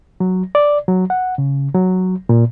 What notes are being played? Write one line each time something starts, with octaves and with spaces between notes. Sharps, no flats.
F#3
D5
F#3
F#5
C#3
F#3
A#2